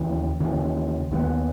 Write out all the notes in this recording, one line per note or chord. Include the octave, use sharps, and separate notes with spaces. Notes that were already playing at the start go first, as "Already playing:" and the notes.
Already playing: D#2 C#3 E3
D#2 C#3 E3
D#2 D#3 G#3 B3